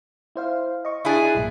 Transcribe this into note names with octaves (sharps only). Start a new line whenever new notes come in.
E4 C5 F5
D#5 C#6
D4 E4 G#4 F#6 A6
B1 G2 A#2